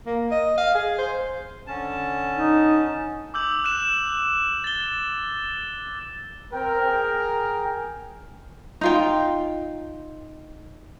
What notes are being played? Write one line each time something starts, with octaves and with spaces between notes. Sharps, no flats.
A#3
D#5
F5
G#4
C5
D3 C#4 A5
D#4
D6 E6 G6 F#7
F#6 E7
A6 G7
C4 A#4 G5
G#4 G5
D#4 F4 G5